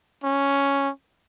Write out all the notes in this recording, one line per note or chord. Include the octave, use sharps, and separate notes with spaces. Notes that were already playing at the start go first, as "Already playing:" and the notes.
C#4